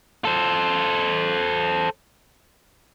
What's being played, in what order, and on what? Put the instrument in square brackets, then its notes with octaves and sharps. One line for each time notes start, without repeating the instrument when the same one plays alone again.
[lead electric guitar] A4 C5